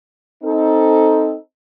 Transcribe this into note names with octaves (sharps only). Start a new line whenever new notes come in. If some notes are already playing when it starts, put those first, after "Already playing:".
C4 D#4 A4